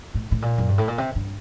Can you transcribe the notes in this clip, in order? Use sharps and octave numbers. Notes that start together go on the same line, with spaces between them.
A2
A2
A#2
F#2
G2
A2
A#2
C3
G2